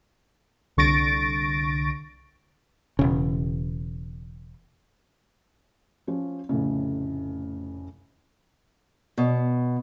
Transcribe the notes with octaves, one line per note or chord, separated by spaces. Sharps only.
C2 D3 C#6 A6 A#6 D7
E1 C#3
F3 C#4
F1 F2 A2 C#3
B2